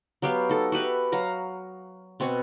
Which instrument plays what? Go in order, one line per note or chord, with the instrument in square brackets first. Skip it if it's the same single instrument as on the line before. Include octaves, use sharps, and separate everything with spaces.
[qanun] F#3 B3 G4 F5
D#4 A4
F#4 G4 B4 E5
F#3 F5 A#5
B2 C4 G#5 C#6